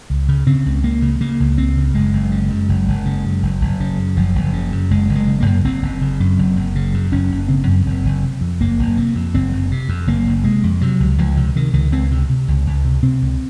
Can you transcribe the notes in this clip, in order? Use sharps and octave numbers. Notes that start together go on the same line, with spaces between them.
C#2
C#3
C#3 C4
C#2
C#2 A#3
C#3
C#3 A#3
C#2
C#2 C4
C#3
F#1 G#3
F#1
C#3
F#2
F#1
F#1
C#3
F#2
F#1
F#1
C#3
F#2
F#1 F3
F#1
C#3
F#2
F#1 G#3
F#1
G#3
C#3
A#3
F#2
F#1 C4
F#1
C#3
F#2
F#1
F#1
C#3
F#2
F#1 C#4
F#1
C#3 C4
F#2
F#1
F#1
C3
F2
F#1 A#3
F#1
C3
F2
F#1 C4
F#1
C3
F2
F#1 A#3
F#1
C3 G#3
F2
C3 F#3
C#2
C#2 F3
C3
C3 D#3
C#2 D#3
C#2 C4
C3
C3
C#2
C#2
C3
C3 C4
C#2